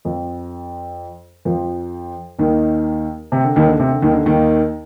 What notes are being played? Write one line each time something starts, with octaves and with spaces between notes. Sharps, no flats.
F2 F3
F2 F3
D#2 D#3
C3
D3
D#2 D#3
D3
C3
D3
D#2 D#3
D3
D#2 D#3